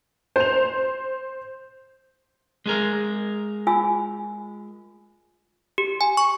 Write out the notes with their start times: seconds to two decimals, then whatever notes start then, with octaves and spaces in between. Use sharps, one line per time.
0.36 C5 F7
2.66 G#3 G#4 A#4
3.67 F4 G#5 E6
5.78 G4
6.01 G#5
6.17 C#6